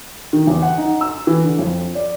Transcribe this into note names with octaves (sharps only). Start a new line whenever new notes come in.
D#3
E2
F#5
D#4
E6
E3
D3
F2
D5